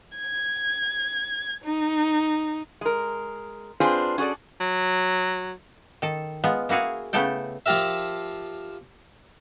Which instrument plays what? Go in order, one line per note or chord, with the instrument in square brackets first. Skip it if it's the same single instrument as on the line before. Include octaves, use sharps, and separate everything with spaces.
[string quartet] G#6
D#4
[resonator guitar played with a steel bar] G#3 A#4
C4 D4 F4 G#4 B4 C5
C#4 F#4 G#4 A4 D5
[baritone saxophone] F#3
[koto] D#3 A4
G#3 B3 F4
A#3 E4 F#4 G#4 F5
C#3 A3 B3 E4 A4 G5
[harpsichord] F3 F4 G4 A#4 E5